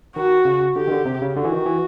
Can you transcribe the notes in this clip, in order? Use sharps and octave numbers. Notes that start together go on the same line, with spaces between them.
D#3 F#4
C#3
D3 G4
D#3
D3
C3
C#3
D3 F#4
E3
D#3
E3